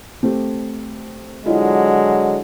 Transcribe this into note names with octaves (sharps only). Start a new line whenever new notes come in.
A3 C4 G4
D3 F#3 G#3 E4 F4 D#5